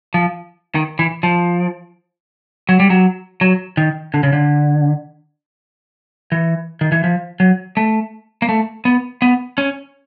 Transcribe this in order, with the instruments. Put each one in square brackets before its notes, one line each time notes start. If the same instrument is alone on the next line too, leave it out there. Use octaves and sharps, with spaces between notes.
[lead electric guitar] F3
D#3
E3
F3
F#3
G3
F#3
F#3
D#3
D3
C#3
D3
E3
D#3
E3
F3
F#3
A3
A#3
A3
B3
B3
C#4